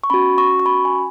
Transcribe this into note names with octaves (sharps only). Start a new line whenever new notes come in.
C#6
C#4 F#4 B5
C#6
C#6
B5
G#5